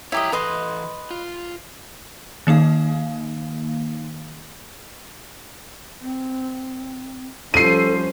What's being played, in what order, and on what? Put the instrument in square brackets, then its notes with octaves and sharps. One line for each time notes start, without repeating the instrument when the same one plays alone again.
[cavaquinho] E4 G4 D#5 [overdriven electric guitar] C#5 A#5
[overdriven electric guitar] E3 A4 [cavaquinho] B4 D#5 C6
[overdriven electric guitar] F4
[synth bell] D#3 A#3 D#4 F5
[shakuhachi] C4
[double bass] F3 G3 [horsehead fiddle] C#4 C5 [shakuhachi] A4 [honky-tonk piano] C7 D#7